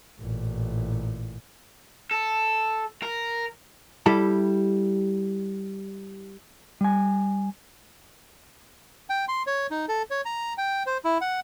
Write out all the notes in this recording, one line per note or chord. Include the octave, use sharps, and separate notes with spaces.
A1 A#2
A4
A#4
G3 E4 G4 A4
G3 G#5
G5
C6
C#5
D#4
A4
C#5
A#5
G5
C5
E4
F#5